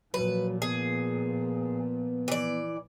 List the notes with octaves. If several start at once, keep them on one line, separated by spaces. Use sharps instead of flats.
A#2 F3 F#3 B4
B3 G#4
E3 D5